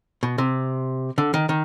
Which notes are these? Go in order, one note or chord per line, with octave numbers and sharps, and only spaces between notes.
B2
C3
D3
D#3
D#3